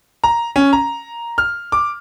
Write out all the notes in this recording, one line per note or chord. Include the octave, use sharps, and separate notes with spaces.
A#5
C#4
A#5
F6
D6